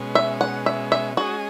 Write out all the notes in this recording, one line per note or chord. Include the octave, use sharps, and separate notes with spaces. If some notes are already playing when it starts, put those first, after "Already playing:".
Already playing: B2 G#3 C#4
E5
F#5
E5
E5
G#3 C#4 F#4 G#4 D#5